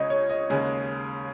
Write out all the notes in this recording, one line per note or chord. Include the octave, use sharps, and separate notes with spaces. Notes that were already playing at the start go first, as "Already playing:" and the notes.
Already playing: C#2 C#3 G#3 C#5 D#5
C#5
D#5
D#2 C#3 G#3 G#5